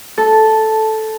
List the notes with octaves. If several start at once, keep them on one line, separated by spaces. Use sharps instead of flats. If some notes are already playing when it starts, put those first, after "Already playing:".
A4